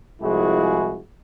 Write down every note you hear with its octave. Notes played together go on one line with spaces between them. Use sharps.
C2 F3 G#3 E4 F#4 G#4